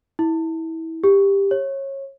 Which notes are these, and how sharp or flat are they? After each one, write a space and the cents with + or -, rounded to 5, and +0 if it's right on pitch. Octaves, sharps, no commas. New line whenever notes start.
E4 -25
G4 +15
C#5 -25